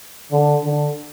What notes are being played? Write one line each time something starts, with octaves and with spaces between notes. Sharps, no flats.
D3
D3